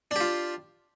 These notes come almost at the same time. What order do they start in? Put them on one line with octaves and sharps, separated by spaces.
D4 G4 F4